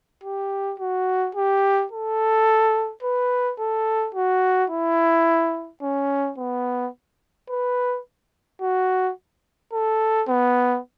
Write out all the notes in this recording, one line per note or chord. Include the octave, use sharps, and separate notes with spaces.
G4
F#4
G4
A4
B4
A4
F#4
E4
C#4
B3
B4
F#4
A4
B3